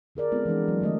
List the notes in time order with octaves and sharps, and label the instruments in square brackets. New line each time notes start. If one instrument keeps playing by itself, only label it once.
[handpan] D3 G#4 A#4 D5
G#3 B3 C4 F4 A4
E3 F3 G#3 D4
F#3
D3 D#3 A3 D#5